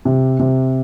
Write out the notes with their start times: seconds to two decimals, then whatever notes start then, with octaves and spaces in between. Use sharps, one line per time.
0.05 C3
0.40 C3